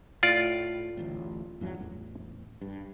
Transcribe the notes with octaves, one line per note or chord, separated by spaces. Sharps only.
A2 F4 D5
D1 A1 A2
E2 G2 F#3
A1 E2
G2